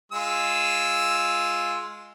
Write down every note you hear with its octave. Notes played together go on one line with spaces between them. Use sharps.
G#3 F4 E6